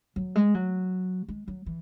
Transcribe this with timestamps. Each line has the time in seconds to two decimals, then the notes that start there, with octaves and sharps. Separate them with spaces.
0.16 F#3
0.36 G#3
0.54 F#3
1.29 G#3
1.48 F#3
1.66 E3